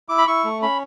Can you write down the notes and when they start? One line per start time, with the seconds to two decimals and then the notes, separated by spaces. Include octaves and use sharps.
0.09 E4 D6
0.18 B5
0.27 E4 C#6
0.44 A3
0.62 C#4 B5